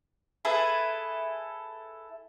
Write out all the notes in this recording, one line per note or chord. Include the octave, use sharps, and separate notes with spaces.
E4 G#4 A4 B4